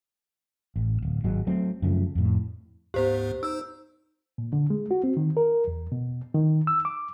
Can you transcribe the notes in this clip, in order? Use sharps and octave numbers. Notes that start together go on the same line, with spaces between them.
A1
D1
G#1 F#3 G#3
F#3 A3 C4
F#2 C#3 F3 A3
F2 A2
D2 G#2 B3 G4 C5
D#4 C5 E6
A#2
D3
G#3
F#4
C4
D#3
A#4
E2
B2
D#3
E6
D6